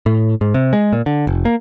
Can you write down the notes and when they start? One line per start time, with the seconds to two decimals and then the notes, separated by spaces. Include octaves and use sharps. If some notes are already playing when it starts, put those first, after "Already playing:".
0.06 A2
0.41 G#2
0.54 C3
0.73 G#3
0.93 A#2
1.06 D3
1.27 F1
1.45 A#3